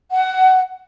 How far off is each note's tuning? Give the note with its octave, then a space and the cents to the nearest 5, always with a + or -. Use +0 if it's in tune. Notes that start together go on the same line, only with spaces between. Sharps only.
F#5 +20